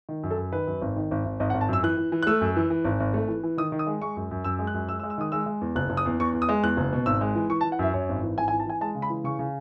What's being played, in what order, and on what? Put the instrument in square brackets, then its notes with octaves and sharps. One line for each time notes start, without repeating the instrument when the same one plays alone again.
[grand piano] D#3
F#2
A4
F#2
D#3 B4
F#2
G#1
D#3
G#1
G#1
G#1 D#5
F#5
G#1
A5
F#2 E6
E3 F#6
E3
E3
F#6
A3 E6
F#2
E3
E3
G#1
G#1
A3
E3
E3
D#3 D#6
D#3
D#6
G#3
G#3 C#6
F#2
F#2
F#2 E6
G#3
F#6
F#2
G#3 E6
E6
G#3
E6
D#3 D#6
G#3 E6
G#3
E2
F#1 F#6
F#1
D#6
E2
E2 C#6
E2
D#6
G#3
E2 F#6
F#1
B2
G#1 E6
G#3
E3
E3 C#6
A5
E3
F#5
F#2 E5
F#2 C#5
G#1
E3
G#1 G#5
G#5
E3
A5
E3 G#5
G#3 A5
C#3
B5
E3
C#3 C#6
C#3